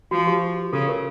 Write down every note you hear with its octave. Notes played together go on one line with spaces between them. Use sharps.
F3 F#4
G4
C#3 A4
A#4